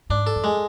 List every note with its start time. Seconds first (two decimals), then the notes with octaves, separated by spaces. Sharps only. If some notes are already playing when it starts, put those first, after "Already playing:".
0.10 G#2 D4
0.27 A4
0.36 F2
0.44 G#3